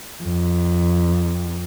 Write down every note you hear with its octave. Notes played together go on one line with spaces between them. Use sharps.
F2